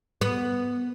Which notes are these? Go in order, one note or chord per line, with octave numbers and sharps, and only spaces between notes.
B3